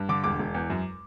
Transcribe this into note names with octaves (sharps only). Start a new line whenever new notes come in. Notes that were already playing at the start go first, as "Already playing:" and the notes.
Already playing: G2
D3 D6
E1 D6
E1
E2
F#2